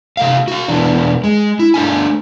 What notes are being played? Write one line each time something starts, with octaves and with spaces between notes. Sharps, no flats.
C3 A3 F5
F#4 F5
E2 B2 E3 B3 D4
G#3
E4
A3 D4 G#5